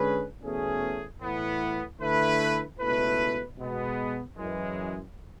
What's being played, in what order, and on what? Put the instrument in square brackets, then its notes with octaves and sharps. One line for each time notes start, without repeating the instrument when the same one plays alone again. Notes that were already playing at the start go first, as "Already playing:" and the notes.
Already playing: [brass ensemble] D3 G#3 C#4 G#4 B4
E2 B2 A3 C#4 G#4
A2 E3 B3
D3 A3 E4 B4
C#2 B2 A3 E4 B4
B2 G#3 B3
F#2 E3 G#3